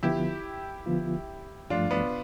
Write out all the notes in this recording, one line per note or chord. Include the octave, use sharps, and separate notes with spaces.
D3 F3 B3 E4 F4 G4
D3 F3 B3 F4
G2 F3 A3 D4 F4
B3 D4